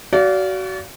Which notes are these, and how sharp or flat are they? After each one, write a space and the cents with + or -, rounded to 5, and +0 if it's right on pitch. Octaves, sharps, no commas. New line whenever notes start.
F#4 +25 D5 -30 F5 -5